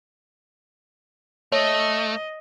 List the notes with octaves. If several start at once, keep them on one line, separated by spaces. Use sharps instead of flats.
A3 C#5 D#5